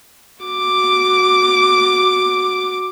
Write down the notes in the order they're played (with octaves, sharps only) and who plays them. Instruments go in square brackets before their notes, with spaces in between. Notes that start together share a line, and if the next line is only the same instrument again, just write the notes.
[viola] F#4 D6